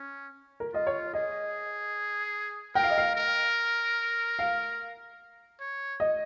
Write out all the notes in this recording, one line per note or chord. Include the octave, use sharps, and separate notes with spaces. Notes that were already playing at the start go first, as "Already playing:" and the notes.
Already playing: C#4
A#4
F4 D#5
C#5
G#4 D#5
A#4 G5
F5
D#5
F5
A#4
F5
C#5
D#5